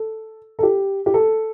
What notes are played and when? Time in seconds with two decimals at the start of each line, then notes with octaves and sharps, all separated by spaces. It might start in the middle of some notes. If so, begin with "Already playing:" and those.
Already playing: A4
0.59 A4
0.63 G4
1.06 G4
1.14 A4